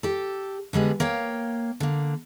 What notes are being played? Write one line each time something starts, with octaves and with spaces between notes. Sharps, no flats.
G4 A4
D3 G3 G#3 B3
A#3 C#5 F5 G5
D3 A#3